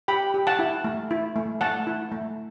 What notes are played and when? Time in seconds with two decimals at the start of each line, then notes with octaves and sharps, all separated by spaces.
0.08 G4 G5 B5
0.34 G4
0.47 F#5 A5
0.59 E4
0.84 A3
1.11 E4
1.36 A3
1.61 A3 F#5 A5
1.87 E4
2.12 A3